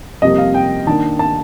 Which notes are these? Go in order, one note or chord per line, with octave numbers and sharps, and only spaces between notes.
F2 C3 G3 A#3 D#5
F5
G5
D#3 A#3 D4 A5
A5